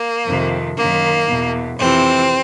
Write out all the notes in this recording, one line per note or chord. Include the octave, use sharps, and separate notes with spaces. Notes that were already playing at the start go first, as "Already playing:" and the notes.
Already playing: A#3
F2 C3 D#3
F#2 D#3 A#3
E2 B2
F2 C3 E3 C4